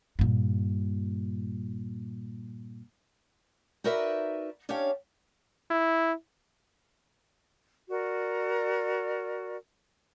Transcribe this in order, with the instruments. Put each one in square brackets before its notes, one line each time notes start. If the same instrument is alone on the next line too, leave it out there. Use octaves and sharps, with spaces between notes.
[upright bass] G2 A#2
[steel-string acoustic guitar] D#4 F#4 A#4 B4 D5 E5
C#4 D4 G4 C#5 F5
[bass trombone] E4
[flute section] F#4 A#4 D5